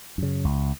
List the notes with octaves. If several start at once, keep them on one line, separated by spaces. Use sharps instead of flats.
F#2 C#3
C#2